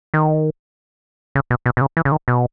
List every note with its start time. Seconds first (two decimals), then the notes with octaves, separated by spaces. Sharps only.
0.14 D#3
1.35 C#3
1.50 B2
1.66 B2
1.77 B2
1.81 C#3
1.97 E3
2.05 C#3
2.12 D#3
2.28 B2